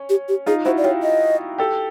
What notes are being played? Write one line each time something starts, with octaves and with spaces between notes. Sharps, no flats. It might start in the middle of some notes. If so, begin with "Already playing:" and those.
Already playing: C#4
G4
G4
D#4 F4 G#4
E4 F#4 C5
D5
F4 G4 C#5
D#5
G4 A4